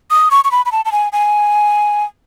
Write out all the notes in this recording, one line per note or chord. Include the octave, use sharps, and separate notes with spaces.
D#6
C#6
C#6
B5
B5
A5
A5
G#5
G#5